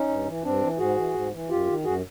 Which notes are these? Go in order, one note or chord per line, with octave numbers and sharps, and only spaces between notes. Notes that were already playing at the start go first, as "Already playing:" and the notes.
Already playing: C#4 D#4
G2
E3
G2 C4 D4
E3
G#2 F#4 G#4
E3
G#2
E3
F#2 F4 G4
D#3
F#2 F#4 G#4